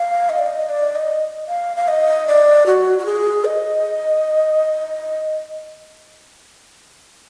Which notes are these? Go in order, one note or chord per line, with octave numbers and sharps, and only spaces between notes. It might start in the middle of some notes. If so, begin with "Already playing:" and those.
Already playing: F5
D#5
D5
D#5
D5
D#5
F5
F5
D#5
D5
F#4
F#4
G#4
D#5